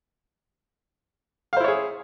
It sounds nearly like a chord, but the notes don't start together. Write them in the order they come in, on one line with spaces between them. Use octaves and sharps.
F5 C5 E4 C#5 G#4